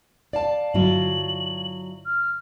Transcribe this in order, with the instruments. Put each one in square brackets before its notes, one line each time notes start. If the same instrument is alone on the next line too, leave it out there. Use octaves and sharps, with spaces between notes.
[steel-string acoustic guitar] D5 F5 A5
[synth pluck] G2 D3 [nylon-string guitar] F#3 E4 F4 [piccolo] F#7
[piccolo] F6